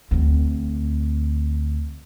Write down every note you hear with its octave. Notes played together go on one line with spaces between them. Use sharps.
D2 C4